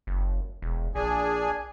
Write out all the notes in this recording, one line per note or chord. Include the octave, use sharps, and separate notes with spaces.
F#1
E1
A#1 D4 G#4 G#5